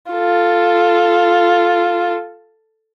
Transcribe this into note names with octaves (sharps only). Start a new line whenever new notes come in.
F4 A4